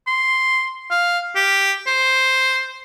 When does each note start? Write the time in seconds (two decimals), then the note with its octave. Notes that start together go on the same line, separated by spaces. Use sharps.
0.07 C6
0.91 F5
1.36 G4
1.87 C5